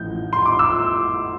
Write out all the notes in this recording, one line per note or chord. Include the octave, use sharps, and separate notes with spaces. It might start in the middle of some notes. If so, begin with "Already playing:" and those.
Already playing: A1 A2 F3 G6
C6
D6
E6